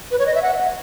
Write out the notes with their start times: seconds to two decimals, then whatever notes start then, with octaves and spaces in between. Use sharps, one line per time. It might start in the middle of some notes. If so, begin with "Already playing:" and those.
0.11 B4
0.19 C#5
0.26 D#5
0.35 E5
0.42 F#5